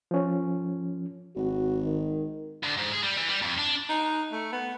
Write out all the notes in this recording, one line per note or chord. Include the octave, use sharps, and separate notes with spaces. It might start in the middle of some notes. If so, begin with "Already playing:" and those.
F3 C#4
G#1 F#4
D#3
D2
G#2
G#4
G3
E3
G3
F2
D4
D#4
A3
B3